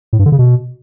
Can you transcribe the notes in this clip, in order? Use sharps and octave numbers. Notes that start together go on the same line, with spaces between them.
A2
G2
D3
C#3
B2